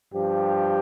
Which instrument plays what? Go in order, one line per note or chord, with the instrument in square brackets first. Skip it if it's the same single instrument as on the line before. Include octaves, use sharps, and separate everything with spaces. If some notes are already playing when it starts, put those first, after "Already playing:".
[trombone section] G2 F3 G4